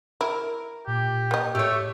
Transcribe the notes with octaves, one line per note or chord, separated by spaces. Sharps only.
E4 A#4
A#2 G4
A#3 D#5
A2 A3 G4 C#5